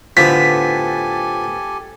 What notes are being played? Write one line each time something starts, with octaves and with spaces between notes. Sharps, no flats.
A2 D3 F3 B3 G4 A4 G#5 B6